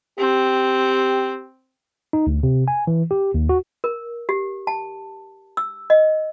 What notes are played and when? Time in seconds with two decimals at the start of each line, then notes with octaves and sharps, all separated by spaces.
0.19 C4 G4
2.13 D#4
2.27 D2
2.43 C3
2.68 G#5
2.87 E3
3.11 G4
3.34 D#2
3.49 F#4
3.84 A#4
4.29 G4
4.67 A5
5.57 E6
5.90 D#5